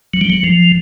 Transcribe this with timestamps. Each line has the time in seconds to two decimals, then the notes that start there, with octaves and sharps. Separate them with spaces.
0.14 F#3
0.21 G3
0.30 F#3
0.44 F3